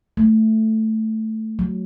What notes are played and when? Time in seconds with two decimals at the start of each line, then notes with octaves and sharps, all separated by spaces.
0.17 A3
1.59 F#3